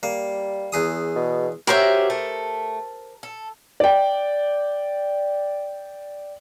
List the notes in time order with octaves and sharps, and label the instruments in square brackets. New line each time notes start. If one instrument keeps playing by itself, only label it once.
[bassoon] G3 [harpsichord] A#3
[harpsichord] E2 G#4 D#6
[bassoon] B2
[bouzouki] C#4 F#4 G4 [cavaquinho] A#4 C5 E5
[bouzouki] A3
A4
[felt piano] D5 G5